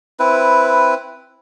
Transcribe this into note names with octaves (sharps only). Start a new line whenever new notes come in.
C4 E4 B4